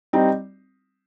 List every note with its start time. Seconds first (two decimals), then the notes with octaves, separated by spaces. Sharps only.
0.13 G3 C4 D#4